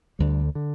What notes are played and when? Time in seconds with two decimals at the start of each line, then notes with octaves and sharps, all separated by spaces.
0.19 D2 D3 G3
0.55 D3